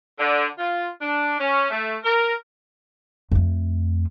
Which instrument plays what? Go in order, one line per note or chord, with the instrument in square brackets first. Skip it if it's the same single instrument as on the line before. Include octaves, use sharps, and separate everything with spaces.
[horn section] D3
F4
D4
C#4
A3
A#4
[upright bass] F2 A3